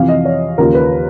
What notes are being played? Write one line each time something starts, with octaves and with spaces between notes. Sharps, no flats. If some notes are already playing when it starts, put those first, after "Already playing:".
Already playing: F2 C3 E3 F5
D#5
C#5
D#2 C#3 F3 A#4
B4